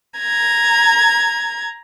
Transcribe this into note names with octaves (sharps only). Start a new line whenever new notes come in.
A#5 G#6